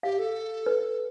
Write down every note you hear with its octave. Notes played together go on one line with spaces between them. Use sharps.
G4 F5
A4
B4